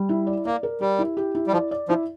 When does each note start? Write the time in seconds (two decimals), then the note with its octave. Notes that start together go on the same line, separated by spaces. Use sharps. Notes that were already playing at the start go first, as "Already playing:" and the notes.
Already playing: G3
0.09 E4
0.27 D5
0.45 A#3 D5
0.63 A#4
0.81 G3 G4
0.99 E4
1.17 G4
1.35 E4
1.47 G3
1.53 F3 D5
1.71 D5
1.89 F3 E4